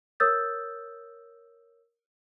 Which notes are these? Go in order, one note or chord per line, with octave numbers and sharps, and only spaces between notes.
A#4 C#5 D#6 E6 G6 A6